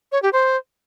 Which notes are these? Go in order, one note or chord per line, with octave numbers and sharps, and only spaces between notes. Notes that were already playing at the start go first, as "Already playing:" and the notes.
C#5
G4
C5